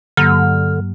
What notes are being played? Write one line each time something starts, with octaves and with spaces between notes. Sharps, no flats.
G2 D3 F#3 A#3 F6